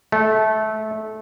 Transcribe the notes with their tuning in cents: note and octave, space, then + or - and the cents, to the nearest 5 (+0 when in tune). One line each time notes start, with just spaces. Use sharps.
A3 -20